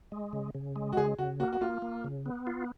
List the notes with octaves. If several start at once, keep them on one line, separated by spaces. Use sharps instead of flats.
G#3
C#3
C#3
G#3
F#4
C#3 G#4
C#3 F#4
A#3 F#4
F#4
A#3 F4
A#3
C#3
B3
F4